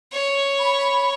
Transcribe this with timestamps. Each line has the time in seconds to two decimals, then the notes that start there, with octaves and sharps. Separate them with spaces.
0.13 C#5
0.59 B5